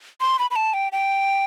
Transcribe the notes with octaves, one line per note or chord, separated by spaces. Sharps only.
C6
B5
B5
A5
G5
G5